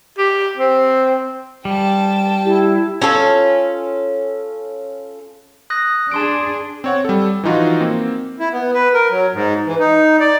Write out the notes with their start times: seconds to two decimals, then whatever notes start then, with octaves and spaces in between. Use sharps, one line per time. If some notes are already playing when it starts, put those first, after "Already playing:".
0.18 G4
0.57 C4
1.65 G3 G5 A5
2.45 E4 G4
3.02 C#4 F4 A4
5.70 D#6 F#6 A#6
6.12 D4 G#4 A5 C6 D7
6.84 C4 C#5 F#5
7.05 G3 A4
7.44 E3 F3 D#4 F4 F#4
7.80 A#3 C4
8.40 E4
8.53 B3
8.74 B4
8.94 A#4
9.10 F#3
9.34 G#2
9.67 E3
9.79 D#4
10.20 D5